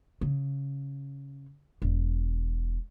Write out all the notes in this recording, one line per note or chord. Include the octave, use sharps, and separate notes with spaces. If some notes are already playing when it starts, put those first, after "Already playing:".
C#3
E1